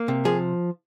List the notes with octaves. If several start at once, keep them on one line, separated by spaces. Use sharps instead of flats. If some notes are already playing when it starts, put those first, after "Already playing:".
Already playing: A#3
C3
F3 G#4